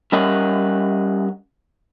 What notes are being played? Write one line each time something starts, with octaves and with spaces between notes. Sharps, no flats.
G3 C#4 A#4 D#5 F#5